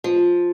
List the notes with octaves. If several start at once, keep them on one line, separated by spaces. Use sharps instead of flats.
F3